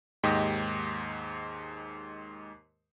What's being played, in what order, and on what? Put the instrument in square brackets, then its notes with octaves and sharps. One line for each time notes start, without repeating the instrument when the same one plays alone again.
[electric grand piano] D#2 G#2 G4 D#5